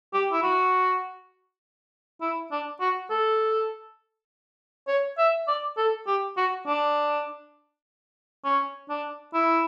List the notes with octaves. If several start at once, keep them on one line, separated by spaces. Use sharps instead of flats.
G4
E4
F#4
E4
D4
F#4
A4
C#5
E5
D5
A4
G4
F#4
D4
C#4
D4
E4